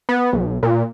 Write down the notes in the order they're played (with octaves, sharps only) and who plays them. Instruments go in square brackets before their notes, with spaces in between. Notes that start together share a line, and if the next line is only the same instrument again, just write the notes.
[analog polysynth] B3
B1
A#2